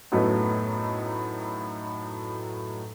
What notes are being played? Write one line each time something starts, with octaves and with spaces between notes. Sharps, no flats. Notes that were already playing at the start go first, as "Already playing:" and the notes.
F#2 A2 F#3 A3 B3 D#4